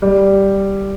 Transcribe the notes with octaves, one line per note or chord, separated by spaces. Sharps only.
G3